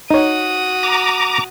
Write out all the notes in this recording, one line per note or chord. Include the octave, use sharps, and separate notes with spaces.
D#4 F#4 C#5 D#6
A#5 D6